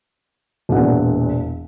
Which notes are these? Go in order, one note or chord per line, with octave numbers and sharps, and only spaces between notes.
E1 E2 A#2 F#5